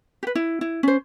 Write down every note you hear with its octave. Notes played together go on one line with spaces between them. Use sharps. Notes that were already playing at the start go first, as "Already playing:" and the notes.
G4 B4
E4
E4
C#4 C5